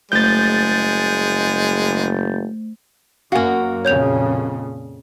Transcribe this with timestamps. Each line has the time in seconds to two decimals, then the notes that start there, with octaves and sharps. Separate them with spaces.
0.12 F#1 G#3 A3 C5 G6 A6
3.32 F#2 A#3 F#4 F5 G#5
3.85 F2 A#2 C#3 C#5 G6 F7